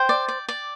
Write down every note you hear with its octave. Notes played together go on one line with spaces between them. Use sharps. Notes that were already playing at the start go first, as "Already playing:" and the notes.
Already playing: C5 G5
D5
D5
D5